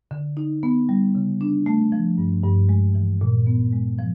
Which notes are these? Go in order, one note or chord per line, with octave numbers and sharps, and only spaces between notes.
D3
D#4
B3
G3
C#3
D4
A3
F3
G2
G2
G#3
E3
A#2
B3
G#3
F3